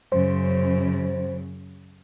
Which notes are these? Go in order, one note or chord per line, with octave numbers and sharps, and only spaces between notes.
F#2 C#3 C5